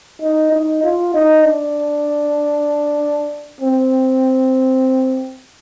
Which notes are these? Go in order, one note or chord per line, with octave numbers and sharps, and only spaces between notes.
D#4
D#4
F4
D#4
D4
C4